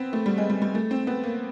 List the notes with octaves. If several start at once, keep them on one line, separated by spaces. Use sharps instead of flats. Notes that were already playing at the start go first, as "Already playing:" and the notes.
Already playing: B3 C4
A3
G3
G#3
G3
G3
A3
C4
B3
A#3